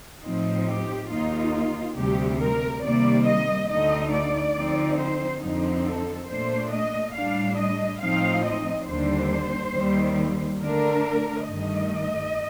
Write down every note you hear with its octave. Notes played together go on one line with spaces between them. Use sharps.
A2 F3 C4 D#4
G4
D#2 D#3 A#3 D#4 F4
D2 C3 G3 G4
A#4
C3 D#3 G3 A#3 D5
D#5
D2 D3 A3 D#4 D#5
D5
D3 F3 C4 D#4
C5
F2 D3 F3 C4 D#4
A4
A#2 A3 D4 C5
D#5
A2 G3 D4 F5
D#5
A2 F3 A3 C4 D#4 F5
D#5
D#2 D3 G3 D4 C5
D#2 D#3 G3 C4
D3 A3 D4 A#4
G2 D#3 A3 D#5